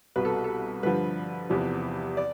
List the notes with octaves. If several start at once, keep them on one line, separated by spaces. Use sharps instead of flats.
C2 B2 B4
A4
A4
G2 D3 F3 B4
E2 C3 F3
D5